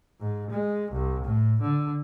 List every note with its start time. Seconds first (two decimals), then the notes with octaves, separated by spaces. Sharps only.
0.20 G#2
0.51 G#3
0.91 C2
1.24 A2
1.61 D3